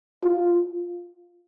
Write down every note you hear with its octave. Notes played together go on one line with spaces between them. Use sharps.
F4